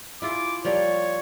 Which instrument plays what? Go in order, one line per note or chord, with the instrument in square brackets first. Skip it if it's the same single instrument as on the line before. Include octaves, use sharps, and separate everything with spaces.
[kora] E4 F4 G#4 [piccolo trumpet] D6
[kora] F3 G3 A#3 [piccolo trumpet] C#5